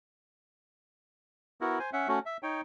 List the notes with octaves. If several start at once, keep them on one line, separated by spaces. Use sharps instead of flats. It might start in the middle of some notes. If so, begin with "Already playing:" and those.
B3 E4 F#4 A#4
C5 G#5
C#4 E5 F#5
A3 C#4 F#4
E5
D#4 C#5 G5